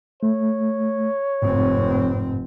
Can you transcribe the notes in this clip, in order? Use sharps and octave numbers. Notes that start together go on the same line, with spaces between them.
A3 C#5
F1 G#2 C4